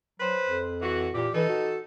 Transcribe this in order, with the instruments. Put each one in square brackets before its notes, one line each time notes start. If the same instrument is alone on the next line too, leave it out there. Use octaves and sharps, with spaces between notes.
[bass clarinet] F#3 [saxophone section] B4 C5
[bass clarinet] F2
[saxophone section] E3 F#4
[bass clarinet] A#2 [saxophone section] E3 G4
[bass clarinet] E3 [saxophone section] D#4 A4
[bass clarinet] F#4